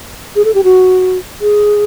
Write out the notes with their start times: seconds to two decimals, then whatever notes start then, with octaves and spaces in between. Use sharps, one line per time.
0.36 G#4
0.45 A4
0.55 G4
0.64 F#4
1.41 G#4